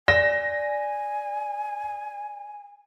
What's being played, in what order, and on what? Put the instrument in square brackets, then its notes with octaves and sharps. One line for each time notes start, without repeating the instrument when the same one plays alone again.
[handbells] D5 [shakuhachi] G#5 [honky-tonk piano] A#6